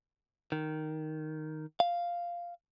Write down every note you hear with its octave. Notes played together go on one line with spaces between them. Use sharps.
D#3
F5